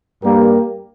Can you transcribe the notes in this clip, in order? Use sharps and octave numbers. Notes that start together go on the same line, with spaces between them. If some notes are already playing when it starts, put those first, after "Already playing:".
G2 G3 A#3 G4 A#4